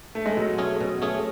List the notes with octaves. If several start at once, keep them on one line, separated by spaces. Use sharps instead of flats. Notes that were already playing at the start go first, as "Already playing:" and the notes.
A3
G#3
B2 F#3
A3 C#4 G#4
B2
A3 C#4 G#4